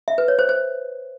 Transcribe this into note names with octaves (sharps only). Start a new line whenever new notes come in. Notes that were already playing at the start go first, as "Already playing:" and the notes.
E5
B4
C#5
C5
C5